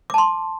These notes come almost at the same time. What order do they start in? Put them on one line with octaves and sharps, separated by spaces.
D6 A5 C6